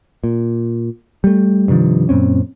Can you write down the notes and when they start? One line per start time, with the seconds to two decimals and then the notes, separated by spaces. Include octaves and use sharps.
0.24 A#2
1.24 G3 A3
1.68 G2 C3 D#3 F3
2.09 F#2 A#2 C4 C#4